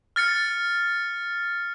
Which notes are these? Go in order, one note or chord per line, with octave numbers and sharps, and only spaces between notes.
F6 A6 C#7